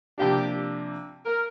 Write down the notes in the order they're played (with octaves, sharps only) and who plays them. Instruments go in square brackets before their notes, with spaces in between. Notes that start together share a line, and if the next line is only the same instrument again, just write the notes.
[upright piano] C3 F3 A#3 D4 [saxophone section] G4
[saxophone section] A#4